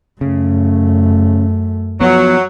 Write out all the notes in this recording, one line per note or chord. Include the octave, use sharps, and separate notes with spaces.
F#2 C#3 A3
F3 F#3 B3